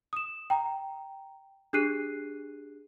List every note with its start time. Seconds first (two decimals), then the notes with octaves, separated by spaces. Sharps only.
0.13 D#6 E7
0.50 G5 A#5
1.73 D4 G4 G#4 F#6 C7 D#7